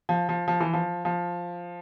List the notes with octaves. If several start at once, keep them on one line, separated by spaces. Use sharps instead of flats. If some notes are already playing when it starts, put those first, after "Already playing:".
F3
F3
F3
E3
F3
F3